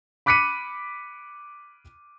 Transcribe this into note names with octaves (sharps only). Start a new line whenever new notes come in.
B5 D6 F#6 B6 C#7 D#7